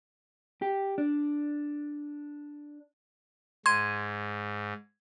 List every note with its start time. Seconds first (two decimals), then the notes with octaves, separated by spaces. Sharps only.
0.62 G4
0.98 D4
3.66 G#2 C6 G#6 D#7